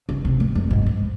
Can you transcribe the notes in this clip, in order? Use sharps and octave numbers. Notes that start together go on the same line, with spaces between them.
C#3
C3
G#2
F#2
G#2
G#2